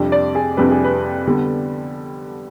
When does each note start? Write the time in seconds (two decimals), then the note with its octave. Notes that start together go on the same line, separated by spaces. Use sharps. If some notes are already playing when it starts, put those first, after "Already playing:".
Already playing: F2 C3 G3 D4
0.12 D5
0.35 G#4
0.57 F2 C3 G3 D4 B4
0.71 G#4
0.84 B4
1.27 D3 G3 B3